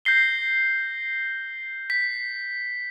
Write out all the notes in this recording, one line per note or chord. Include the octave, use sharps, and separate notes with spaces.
G6 A#6 C7 G7
B6